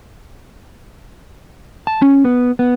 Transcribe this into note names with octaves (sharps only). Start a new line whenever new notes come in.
A5
C#4
B3
B3